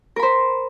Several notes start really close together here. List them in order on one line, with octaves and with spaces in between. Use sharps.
A#4 B5 C5